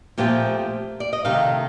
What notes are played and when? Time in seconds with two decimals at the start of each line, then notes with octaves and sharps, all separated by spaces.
0.18 A#2 F3 A3 C4 G4
1.00 D5
1.13 D#5
1.25 C3 D#3 A3 F5